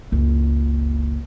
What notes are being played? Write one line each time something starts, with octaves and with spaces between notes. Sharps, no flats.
F#1 C#2